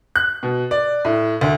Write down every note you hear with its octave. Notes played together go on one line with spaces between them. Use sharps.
F#6
B2
D5
A2
D2